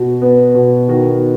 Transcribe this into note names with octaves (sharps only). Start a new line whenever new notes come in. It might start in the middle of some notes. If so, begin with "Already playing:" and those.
Already playing: B2 F#4
B3
B2
D#3 F#4